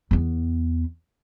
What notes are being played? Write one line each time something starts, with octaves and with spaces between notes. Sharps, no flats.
E2 B3